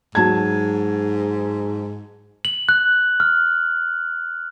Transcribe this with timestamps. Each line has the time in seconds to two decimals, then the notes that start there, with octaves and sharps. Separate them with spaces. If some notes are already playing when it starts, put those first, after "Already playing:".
0.15 G#2 F#3 A5 G#6
2.45 F#7
2.69 F#6
3.20 F6